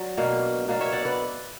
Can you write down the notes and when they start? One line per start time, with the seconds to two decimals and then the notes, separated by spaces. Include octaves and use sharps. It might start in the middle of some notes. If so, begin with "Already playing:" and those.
Already playing: F#3 D5
0.17 B2 A#3 D4
0.68 B2 A#3 D4
0.81 C#5 E5
0.92 D5 F#5
1.05 B4 D5